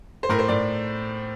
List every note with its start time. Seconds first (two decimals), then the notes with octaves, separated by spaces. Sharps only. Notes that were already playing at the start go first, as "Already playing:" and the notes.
0.23 C5
0.29 A2 A#4
0.39 C5
0.48 A2 D5